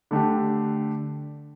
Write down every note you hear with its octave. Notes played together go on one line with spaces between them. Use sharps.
D3 A3 D4 G4